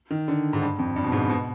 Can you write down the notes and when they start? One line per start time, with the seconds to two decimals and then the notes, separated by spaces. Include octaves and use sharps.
0.11 D#3
0.28 D3
0.53 G#2
0.62 G2
0.79 F2
0.96 G2
1.04 B2
1.12 G#2
1.21 G2
1.30 B2